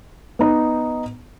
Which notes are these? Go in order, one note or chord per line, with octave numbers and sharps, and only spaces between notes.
B3 D#4